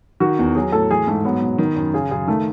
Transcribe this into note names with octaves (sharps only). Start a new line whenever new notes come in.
D#3 F#4
E2
F#3 G#4
A2 A4
E3 G#4
G#2 A3
F#3 B3
B2
D#3
F#2
C#3 G#4
F#2 G#4
D#3 A3